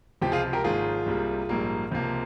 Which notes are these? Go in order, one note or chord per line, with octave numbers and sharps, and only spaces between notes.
C#2 C3 F3 G4
F4 G#4
G4 A#4
G#1 G#2 F3 A#3 F4 G#4
C2 C3 G3 A#3
A#1 G#2 G3 A#3
C#2 C3 F3 A#3